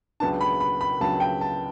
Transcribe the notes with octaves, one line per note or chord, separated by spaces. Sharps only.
C#2 C#3 F#3 B3 D4 A5
B5
B5
B5
C#2 C#3 F#3 B3 D4 A5
G5
A5